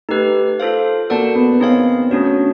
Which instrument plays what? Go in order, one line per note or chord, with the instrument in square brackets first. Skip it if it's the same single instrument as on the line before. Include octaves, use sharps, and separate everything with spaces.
[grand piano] A3 [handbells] D#4 G4 B4
[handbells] F4 A4 C5 F5
[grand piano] A#3 [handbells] F#4 A4 D5 F#5 A5
[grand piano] B3
B3
[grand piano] C4 [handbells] D#4 G#4 C#5 F5
[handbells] A3 D4 F#4 [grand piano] C#4